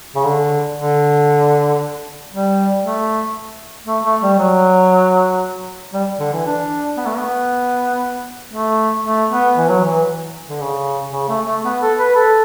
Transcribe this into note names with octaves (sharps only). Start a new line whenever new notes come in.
C#3
D3
D3
G3
A3
A3
A3
G3
F#3
G3
D3
E3
D4
B3
A3
B3
A3
A3
B3
E3
F#3
E3
D3
C#3
C#3
A3
A3
B3
A4
B4
A4